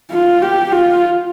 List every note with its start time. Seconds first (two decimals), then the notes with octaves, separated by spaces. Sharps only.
0.11 F4
0.42 G4
0.72 F4